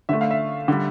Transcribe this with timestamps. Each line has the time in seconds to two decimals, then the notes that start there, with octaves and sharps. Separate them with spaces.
0.09 D3 A3 E5
0.21 F5
0.31 E5
0.68 D3 G3